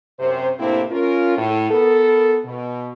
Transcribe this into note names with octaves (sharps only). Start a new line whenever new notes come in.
F#2 C3 C5
A2 C3 A#3 C4 D4 E4
C#4 F4 A#4
A2
B3 A4 A#4
B2